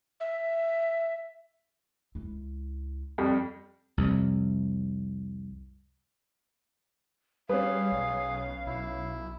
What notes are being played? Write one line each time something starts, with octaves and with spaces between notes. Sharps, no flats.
E5
C#2 E4
F2 G3
C2 F2
G3 C#4 G#4 B4 F5
B1
B1 E4